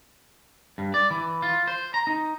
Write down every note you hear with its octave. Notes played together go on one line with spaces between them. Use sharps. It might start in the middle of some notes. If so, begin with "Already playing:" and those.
G2
D5
E3
F4
C5
A#5
D#4